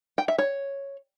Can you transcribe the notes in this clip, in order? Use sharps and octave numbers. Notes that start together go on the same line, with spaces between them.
G5
E5
C#5